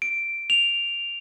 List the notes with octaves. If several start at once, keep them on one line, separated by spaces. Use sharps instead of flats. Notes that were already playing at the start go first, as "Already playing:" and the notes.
D7
F7